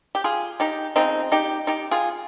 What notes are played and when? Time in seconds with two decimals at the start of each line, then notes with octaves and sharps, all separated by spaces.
0.15 G4
0.24 F4 G#4
0.60 D#4 G4
0.96 C#3 F3 G#3 C4 D#4
1.32 D#4 G4
1.67 D#4 G4
1.91 F4 G#4